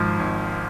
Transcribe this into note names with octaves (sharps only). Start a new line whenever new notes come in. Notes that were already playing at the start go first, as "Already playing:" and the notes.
Already playing: G#1 G#2 F3
G#1